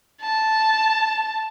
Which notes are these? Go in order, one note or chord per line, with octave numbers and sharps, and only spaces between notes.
A5